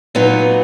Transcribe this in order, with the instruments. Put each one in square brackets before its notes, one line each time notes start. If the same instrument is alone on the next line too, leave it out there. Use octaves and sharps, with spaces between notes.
[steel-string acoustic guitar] A#2 F#3 B3 D#4